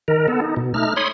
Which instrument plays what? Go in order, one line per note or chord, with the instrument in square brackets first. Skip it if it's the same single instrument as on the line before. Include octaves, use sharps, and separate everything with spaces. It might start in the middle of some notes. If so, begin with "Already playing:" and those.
[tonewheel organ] D#3 A#4
B3 A4
D#4
B2
A3 D#4 F6
C#5 B5 C6 D#6